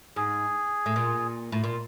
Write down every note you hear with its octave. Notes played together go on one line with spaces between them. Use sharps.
G#2 G#4
A2
A#2
A2
A#2